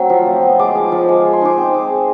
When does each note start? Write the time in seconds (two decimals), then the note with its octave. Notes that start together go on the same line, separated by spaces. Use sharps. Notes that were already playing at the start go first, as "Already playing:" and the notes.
Already playing: F#3 A3 C4
0.10 F3
0.26 F3
0.43 B3
0.59 G#3 D6
0.75 F3
0.92 F3
1.09 G#3
1.25 G#3
1.33 C6
1.42 D#4 D6
1.58 C4
1.74 G#3
1.90 G#3